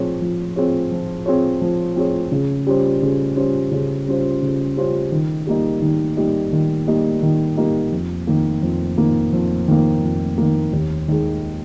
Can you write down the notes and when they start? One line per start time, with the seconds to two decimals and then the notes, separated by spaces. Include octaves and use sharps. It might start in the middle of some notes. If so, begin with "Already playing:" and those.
Already playing: F3 C4 F4 G#4 C#5
0.21 F3
0.56 C4 F4 G#4 C#5
0.91 F3
1.26 C4 F4 G#4 C#5
1.61 F3
1.96 C4 F4 G#4 C#5
2.32 C#3
2.67 G3 C#4 F4 C5
3.02 C#3
3.37 G3 C#4 F4 C5
3.72 C#3
4.07 G3 C#4 F4 C5
4.42 C#3
4.77 G3 C#4 F4 C5
5.12 D#3
5.47 G3 A#3 D#4
5.82 D#3
6.17 G3 A#3 D#4
6.52 D#3
6.87 G3 A#3 D#4
7.23 D#3
7.57 G3 A#3 D#4
7.92 F2
8.27 D#3 A#3
8.62 F2
8.98 D#3 A#3
9.33 F2
9.68 D#3 A#3
10.03 F2
10.38 D#3 A#3
10.73 D#2
11.08 D#3 G#3